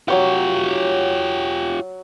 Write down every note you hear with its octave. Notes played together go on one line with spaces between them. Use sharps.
F#3 F4 G4 C#5 F#5